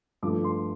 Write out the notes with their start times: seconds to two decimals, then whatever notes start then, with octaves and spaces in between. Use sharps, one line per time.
0.22 G2 F3 A3 D6
0.44 C6